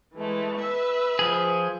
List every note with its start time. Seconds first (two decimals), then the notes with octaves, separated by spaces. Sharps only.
0.15 E3 G#3 A3
0.57 B4 E5 E6
1.19 F3 G#4